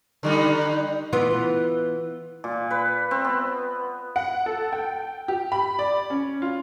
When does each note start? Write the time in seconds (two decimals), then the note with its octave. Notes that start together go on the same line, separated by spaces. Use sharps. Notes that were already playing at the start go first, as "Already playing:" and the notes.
0.23 D3 G3 D#4
1.13 E3 B3 F4
2.44 A#2
2.71 B4
3.11 C4
3.25 B3
4.16 F#5
4.46 A4
4.73 G5
5.28 G4
5.52 B5
5.79 D5
6.10 C#4
6.42 F4